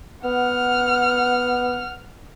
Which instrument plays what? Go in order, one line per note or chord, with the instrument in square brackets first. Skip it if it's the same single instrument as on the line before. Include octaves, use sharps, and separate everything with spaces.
[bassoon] B3 [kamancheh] F#5 F6